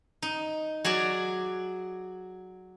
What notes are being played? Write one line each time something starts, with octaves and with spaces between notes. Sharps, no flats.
D#4
F#3 F#4 G#4 D5